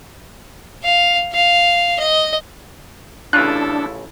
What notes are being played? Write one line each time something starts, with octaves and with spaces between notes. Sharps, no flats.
F5
F5
D#5
A1 C#3 D4 E4 F4 A4 F#6